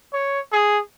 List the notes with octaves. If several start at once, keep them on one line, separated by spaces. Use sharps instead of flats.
C#5
G#4